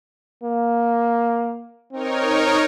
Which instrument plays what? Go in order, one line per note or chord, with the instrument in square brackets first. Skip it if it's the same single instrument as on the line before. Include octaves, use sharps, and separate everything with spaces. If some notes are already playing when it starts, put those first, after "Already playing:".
[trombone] A#3
[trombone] C4 [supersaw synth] D#4 A#4 C#5